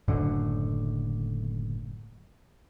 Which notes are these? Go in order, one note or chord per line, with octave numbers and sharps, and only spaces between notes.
F#1 F#2 A2 D3